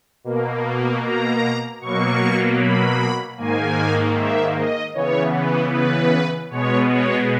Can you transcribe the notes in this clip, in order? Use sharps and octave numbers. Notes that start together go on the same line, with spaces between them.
B2 A#3
A#5
B2 F#3 A#3 C#6
B5
G#2 D#3 A#3 G#5
E5
D#5
C#3 E3 B3 C#5
B4
B4
B2 G#3 B3 C#5
C#5